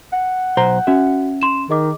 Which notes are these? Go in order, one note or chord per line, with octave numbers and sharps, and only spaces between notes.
F#5
B1 C5 A#5 G6
C#4 F#4 E5
C6 E7
D#3 G#4 D#5 D6